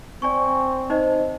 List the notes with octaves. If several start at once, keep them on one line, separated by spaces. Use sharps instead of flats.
C4 D5 G#5 C#6
D#4 C5 D#5